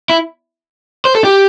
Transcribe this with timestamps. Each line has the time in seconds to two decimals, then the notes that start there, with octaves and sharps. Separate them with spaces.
0.10 E4
1.05 C5
1.15 A4
1.24 G4